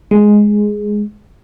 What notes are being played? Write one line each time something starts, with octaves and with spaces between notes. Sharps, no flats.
G#3